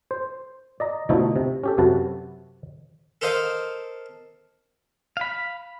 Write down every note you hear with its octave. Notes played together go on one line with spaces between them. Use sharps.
C5
D5 D#5 A#5
B2 D3 F3 A3 D#4 E4
C3
C#4 G4 A4
F#2 C3 F#4 B4 A5
A4 A#4 C5 D#5 F5
F5 B5